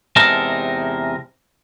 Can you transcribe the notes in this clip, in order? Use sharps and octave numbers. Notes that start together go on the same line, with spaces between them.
E2 C3 G#3 D#4 A#4 A5